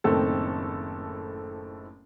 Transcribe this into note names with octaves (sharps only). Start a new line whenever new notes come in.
F#1 A2 D#3 C4 A4